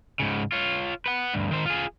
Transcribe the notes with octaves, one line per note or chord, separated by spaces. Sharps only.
G#2 C#3
F4 C#5
B4 F#5
D2 G2
D#3 C5
F4 G#4